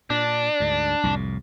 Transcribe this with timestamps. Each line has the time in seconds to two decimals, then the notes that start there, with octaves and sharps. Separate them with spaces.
0.10 A#2 D4
0.60 D2 G#2
1.03 C2 F2 A2